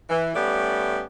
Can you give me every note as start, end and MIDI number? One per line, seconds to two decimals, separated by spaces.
0.10 0.34 52
0.35 1.03 55
0.35 1.03 57
0.35 1.03 59
0.35 1.03 61
0.35 1.03 74